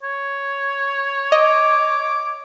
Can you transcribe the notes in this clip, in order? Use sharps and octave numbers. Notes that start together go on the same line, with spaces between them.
C#5
D#5 D6